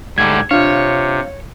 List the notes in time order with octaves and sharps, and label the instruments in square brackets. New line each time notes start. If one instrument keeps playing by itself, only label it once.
[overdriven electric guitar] G#2 A3 [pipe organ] D3 G3 [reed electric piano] G#6
[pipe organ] C3 [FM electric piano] D4 F4 [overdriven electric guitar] C#5 [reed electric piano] F5